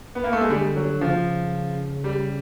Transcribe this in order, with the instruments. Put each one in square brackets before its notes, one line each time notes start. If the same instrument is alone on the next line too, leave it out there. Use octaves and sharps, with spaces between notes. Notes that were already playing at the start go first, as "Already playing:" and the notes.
[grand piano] B3
A#3
A3
G#3
[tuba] D3 [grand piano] G3
[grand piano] F#3
[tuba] C#3 [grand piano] F3
[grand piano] G3